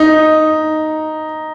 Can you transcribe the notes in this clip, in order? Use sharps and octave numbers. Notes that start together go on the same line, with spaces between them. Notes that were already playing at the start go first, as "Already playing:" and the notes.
Already playing: D#4